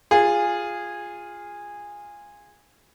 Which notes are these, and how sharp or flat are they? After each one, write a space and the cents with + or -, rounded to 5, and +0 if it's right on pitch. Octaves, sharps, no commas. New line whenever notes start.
F4 +0 G#4 -15